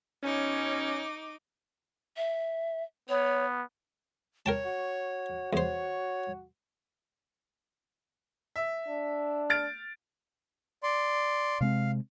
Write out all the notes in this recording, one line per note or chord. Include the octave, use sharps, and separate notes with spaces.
B2 C#4 D#4 D6
E5
B3 C#5
A#4 C#5 G5 A5
F#4
E2 C5 C#5
E5
D4
F6 A6 D7
D5 C6
C3 G#3 C4 F5